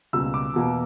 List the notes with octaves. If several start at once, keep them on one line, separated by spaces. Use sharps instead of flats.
C#2 B2 G3 A#3 E6
D6
E2 B2 A#3